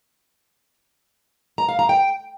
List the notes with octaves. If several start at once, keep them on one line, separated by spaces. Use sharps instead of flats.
A#5
F5
A#5
G5